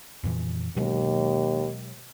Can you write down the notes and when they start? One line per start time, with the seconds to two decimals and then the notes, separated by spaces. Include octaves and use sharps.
0.24 F2 A#2 E3
0.77 D#2 B2 F#3 G#3